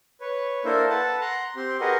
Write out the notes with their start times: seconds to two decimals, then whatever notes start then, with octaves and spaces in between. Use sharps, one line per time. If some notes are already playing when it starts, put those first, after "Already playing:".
0.21 B4 C#5
0.65 A#3 D4 E4 A4 A#4 C5
0.90 A4 B4 F#5 A5
1.21 F#5 A#5 C6 F#6
1.56 C4 G4 C6
1.81 F#4 G#4 A#4 B4 D#5 F#5